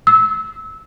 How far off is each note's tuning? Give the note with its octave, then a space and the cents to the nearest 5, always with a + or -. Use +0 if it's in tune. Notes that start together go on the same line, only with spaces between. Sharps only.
E6 -25